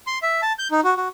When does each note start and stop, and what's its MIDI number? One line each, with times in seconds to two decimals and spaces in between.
0.07 0.19 84
0.23 0.41 76
0.42 0.53 81
0.59 0.68 91
0.71 0.80 63
0.84 0.94 66
0.97 1.08 66